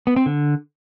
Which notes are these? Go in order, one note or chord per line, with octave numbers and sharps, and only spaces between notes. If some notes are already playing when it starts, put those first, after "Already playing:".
B3
C4
D3